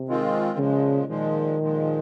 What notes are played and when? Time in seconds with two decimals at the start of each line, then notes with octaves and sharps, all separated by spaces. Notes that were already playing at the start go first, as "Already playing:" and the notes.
Already playing: C3
0.09 D#3 G#3 C4 F4
0.58 A#2 C#3 F3 G#3
1.08 A#2 D#3 F3 G#3
1.59 A#2 F3 G#3